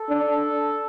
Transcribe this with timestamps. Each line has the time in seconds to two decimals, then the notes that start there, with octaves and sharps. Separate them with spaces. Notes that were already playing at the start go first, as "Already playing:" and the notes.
Already playing: A4
0.09 D4